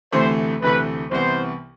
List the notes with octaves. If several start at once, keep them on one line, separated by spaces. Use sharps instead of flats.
D2 C3 E3 A3 C5
D2 C3 E3 A3 B4
C2 C3 E3 B3 C5